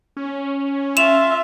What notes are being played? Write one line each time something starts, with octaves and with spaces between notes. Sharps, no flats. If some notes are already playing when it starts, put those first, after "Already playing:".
C#4
F4 E5 E7 F7